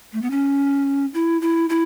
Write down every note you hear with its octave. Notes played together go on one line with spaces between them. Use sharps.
A3
B3
C#4
E4
E4
E4